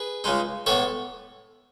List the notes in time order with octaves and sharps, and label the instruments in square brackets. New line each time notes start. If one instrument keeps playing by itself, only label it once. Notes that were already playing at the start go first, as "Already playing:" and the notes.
Already playing: [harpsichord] G#4 B4
C#2 C#3 G#3 D#4
A2 E3 B3 A4 C#5